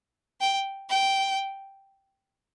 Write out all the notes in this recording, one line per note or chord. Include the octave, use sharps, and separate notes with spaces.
G5
G5